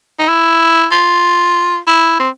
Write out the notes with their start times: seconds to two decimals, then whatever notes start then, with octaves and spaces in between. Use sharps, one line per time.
0.19 D#4
0.29 E4
0.91 F4
1.87 E4
2.20 C4